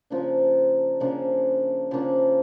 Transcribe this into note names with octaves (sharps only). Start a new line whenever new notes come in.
C#3 F3 A#3 D4
C#3 F3 A#3 D4
C#3 F3 A#3 D4